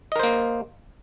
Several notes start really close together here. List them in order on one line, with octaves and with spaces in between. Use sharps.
D#5 A#4 C5 A#3